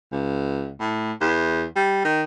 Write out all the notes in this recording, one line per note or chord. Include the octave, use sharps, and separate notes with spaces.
C#2
A2
E2
G3
D#3